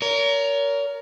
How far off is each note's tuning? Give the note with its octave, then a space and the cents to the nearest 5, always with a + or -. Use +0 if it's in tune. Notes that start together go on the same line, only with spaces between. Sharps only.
A#4 +0 C#5 +40